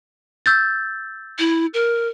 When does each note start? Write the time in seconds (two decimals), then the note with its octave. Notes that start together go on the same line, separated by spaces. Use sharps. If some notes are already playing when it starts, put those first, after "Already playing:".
0.46 E6 G6 A6
1.39 E4
1.74 A#4